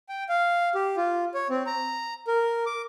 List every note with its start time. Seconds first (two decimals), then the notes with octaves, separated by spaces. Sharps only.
0.09 G5
0.29 F5
0.75 G4
0.97 F4
1.34 C#5
1.50 C4
1.66 A#5
2.28 A#4
2.66 D6